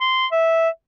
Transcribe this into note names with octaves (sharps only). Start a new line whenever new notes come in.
C6
E5